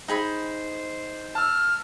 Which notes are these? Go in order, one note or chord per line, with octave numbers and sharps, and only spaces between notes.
D#4 G#4 C5 B5
A5 E6 F6